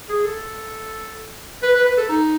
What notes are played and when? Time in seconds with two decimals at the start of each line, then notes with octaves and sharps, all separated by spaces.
0.09 G#4
0.25 A4
1.63 B4
1.74 B4
1.86 B4
1.97 A4
2.09 D#4